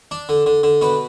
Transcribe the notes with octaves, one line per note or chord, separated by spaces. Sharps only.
D4
D3
D3
D3
B2 B4